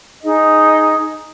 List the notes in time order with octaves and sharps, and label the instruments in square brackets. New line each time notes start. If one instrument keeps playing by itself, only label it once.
[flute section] D#4 G#4 D#5